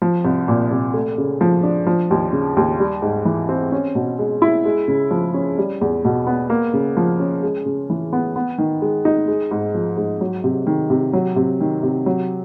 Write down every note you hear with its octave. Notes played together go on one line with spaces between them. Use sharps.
F3
C2
A#2
C2
A3
C#3
F3
D4
F3
D#2
C#3
D#2
G3
G#2
E3
C4
C#4
B2
G#3
E4
G#3
C#3
F3
C#4
G3
E2
B2
B3
A#3
C#3
F3
C#4
G#3
C#3
E3
B3
B3
D#3
G#3
D#4
G#3
G#2
F3
G#2
F#3
C3
D#3
C3
F#3
C3
D#3
C3
F#3